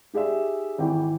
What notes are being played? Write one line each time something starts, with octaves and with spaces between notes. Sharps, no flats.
D#4 G4 G#4 D5 E5
G#1 E3 G5